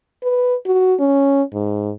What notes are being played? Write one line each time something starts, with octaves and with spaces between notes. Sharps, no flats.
B4
F#4
C#4
G#2